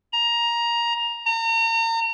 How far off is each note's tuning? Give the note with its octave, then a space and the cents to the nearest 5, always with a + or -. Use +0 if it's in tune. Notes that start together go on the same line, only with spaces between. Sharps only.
A#5 +15
A#5 -40